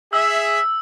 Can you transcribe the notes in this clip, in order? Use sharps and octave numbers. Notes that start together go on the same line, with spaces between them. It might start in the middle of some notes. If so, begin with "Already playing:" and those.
G#4 E5 E6